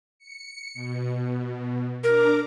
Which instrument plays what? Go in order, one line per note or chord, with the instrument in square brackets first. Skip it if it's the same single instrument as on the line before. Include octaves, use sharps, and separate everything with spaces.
[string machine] C#7
B2
[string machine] D4 A#5 D6 [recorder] A#4